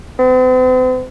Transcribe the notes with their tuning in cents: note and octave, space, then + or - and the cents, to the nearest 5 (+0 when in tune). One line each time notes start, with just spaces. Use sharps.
C4 -45